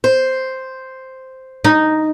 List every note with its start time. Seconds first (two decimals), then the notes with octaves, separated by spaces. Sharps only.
0.04 C5
1.64 D#4